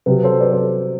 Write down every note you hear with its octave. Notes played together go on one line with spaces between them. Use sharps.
C3 F#3 G4 B4
A4 C5
B4 D5
A4 C5